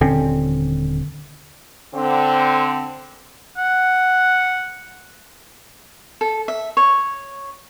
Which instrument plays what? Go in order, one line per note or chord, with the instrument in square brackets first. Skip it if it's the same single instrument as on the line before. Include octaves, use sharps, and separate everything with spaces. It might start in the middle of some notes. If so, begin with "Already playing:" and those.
[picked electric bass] D#1 D3 C4 C#4
[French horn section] D3 C4
[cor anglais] F#5
[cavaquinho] A4
E5
C#5